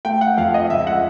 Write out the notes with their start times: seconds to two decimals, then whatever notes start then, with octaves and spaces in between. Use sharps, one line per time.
0.05 A3 G5
0.21 F#5
0.37 F2 F5
0.54 D#5
0.70 C#2 E5
0.87 F#5